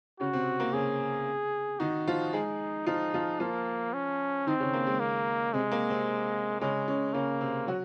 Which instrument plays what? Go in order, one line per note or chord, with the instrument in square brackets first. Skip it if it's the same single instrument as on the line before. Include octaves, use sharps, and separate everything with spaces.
[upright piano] C#3 C#4 [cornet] F#4
[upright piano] C3 C4
A#3
[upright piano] C#3 C#4 [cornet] G#4
[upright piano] D#3 D#4 [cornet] F#4
[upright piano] F3 F4
[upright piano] G#3 G#4 [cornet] D#4
[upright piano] F3 F4 [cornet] D#4
[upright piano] F3 F4
[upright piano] F3 F4 [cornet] A#3
[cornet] C#4
[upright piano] D#3 D#4 [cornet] C4
[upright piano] C#3 C#4
A#3
G#3
[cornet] A#3
[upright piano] C3 C4 [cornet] G#3
[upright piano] A#3
C3 C4
[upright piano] C#3 C#4 [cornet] G#3
[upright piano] C#3 C#4
[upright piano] C#3 C#4 [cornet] A#3
[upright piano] C3 C4
F#3 F#4